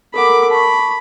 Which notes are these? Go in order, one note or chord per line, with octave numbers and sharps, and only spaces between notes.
A4 A#4 F#5 B5 D6
A5 B5 C#6